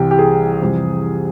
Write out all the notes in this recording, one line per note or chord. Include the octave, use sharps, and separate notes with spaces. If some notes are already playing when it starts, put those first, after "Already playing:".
Already playing: C2 C3 E3 G4
G4
G#4
F2 C3 E3 G3